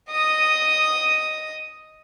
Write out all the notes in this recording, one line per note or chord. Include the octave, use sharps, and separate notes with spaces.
D#5 D#6